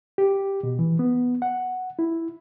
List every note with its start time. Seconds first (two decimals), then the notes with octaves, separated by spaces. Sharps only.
0.18 G4
0.63 B2
0.79 E3
0.99 B3
1.42 F#5
1.99 E4